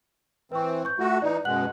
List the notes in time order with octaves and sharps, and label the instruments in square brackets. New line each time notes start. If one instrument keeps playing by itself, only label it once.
[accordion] E3 C4 [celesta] B4 C#6
[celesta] C#6 G6
[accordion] A3 F#4 [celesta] F4
[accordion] E3 D#4 [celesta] D5
[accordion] F#2 B2 G#3 [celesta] F#5 F#6 F#7